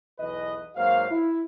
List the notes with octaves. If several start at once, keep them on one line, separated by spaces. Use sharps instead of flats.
B1 E2 E3 B4 D#5
G#2 F#3 A#3 F#4 C5 F5
E4